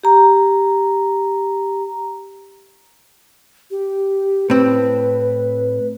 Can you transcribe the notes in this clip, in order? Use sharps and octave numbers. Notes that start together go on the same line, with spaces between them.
G4 A#5
G4
A2 C4 B4